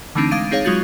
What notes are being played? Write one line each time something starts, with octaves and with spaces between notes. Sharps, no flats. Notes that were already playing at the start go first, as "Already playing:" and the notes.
D3 E3 A3 C4 D4 D#4
G#3 F5 D6 A6 D7 D#7
C4 D#4 G#4 C#5 F5
F#3 G#3 F4 F#4 G6 A6